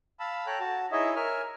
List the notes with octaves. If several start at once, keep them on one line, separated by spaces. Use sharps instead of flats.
F5 A5 B5 E6
A4 C#5 G5 A#5 F#6
F#4 A5
D#4 E4 G#4 C#5 D#5 E5
A#4 C#5 E5 G#5 F6